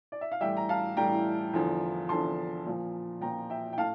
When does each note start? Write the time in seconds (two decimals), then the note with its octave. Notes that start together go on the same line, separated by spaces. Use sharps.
0.12 D5
0.21 E5
0.32 F5
0.41 A2 E3 G3 E5 G5
0.57 A#5
0.69 F5 A5
0.97 A2 E3 G3 G5 A#5
1.53 E2 D3 F3
2.09 E2 D3 F3 A5 C6
2.66 A#2 F3
3.21 A#2 F3 G5 A#5
3.50 E5 G5
3.73 G5
3.78 A2 F5 A5